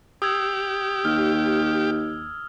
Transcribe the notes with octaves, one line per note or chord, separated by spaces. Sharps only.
G4 D#6 E6 G#6
D#2 F6